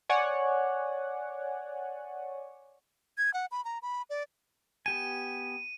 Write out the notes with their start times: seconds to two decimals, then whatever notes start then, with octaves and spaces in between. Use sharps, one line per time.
0.10 C#5 D5 F#5 G#5
3.18 G#6
3.34 F#5
3.51 B5
3.65 A#5
3.82 B5
4.10 D5
4.86 B3 G4 G#5 D#7